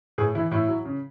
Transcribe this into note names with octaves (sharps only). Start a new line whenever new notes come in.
A2 G#4
E3 E4
A2 E4
F#3
C#3